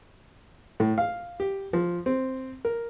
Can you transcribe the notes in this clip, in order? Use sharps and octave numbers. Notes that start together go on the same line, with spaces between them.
A2
F5
G4
F3
C4
A#4